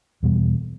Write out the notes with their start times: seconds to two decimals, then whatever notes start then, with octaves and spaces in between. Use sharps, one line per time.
0.23 E2 B2 G3